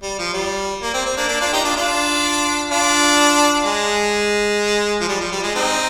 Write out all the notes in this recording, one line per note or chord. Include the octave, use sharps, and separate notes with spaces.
G3
F3
G3
A#3
C4
C4
A#3 D4
A#3 D4
D4 F4
D#4 G4
D4 F4
D4 F4
D4 F4
G#3
F3
G3
F3
G3
G#3
C4 D#4